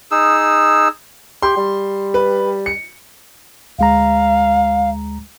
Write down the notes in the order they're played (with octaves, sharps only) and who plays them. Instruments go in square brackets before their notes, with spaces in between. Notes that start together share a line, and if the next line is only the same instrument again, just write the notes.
[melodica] D#4 G#4 E6
[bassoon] G4 [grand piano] C6
[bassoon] G3
[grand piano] B4
C#7
[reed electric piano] D2 G#3 A#5 [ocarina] F5